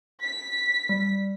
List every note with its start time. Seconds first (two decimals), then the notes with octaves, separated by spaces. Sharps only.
0.22 B6
0.89 G3